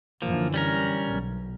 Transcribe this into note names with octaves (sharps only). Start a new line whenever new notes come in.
F#2 D3 E3 F3 A#3
G3 C#4 A#4
B1